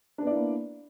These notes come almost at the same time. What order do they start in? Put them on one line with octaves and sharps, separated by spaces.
D4 B3 D5 E4 A#3